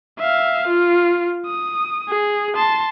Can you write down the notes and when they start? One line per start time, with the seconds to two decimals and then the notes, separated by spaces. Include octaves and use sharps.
0.19 E5 F5
0.67 F4
1.47 D#6
2.09 G#4
2.56 A5 C6